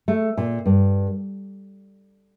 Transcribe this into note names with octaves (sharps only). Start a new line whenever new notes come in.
A3
A#2
G2